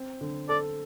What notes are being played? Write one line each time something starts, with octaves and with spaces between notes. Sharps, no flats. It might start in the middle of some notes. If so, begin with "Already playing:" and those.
Already playing: C4
D3
A4 D5